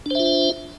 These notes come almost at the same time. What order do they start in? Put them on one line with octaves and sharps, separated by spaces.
D4 C5 E5 F4